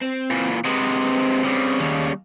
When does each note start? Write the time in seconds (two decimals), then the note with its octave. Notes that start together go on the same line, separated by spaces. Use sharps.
0.01 C4
0.30 A#2 E3
0.65 C3 G#3 C4 B4
1.44 C#3 G3
1.80 D#2